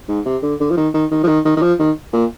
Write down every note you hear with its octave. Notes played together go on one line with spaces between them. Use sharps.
G#2
C3
D3
D3
F3
D#3
D#3
D#3
F3
D#3
D#3
D#3
F3
D#3
A#2